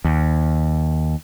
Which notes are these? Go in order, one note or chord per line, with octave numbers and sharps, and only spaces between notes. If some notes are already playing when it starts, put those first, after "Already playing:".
D#2